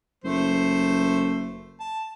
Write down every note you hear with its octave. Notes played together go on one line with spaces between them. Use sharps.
F#1 A3 C5
A5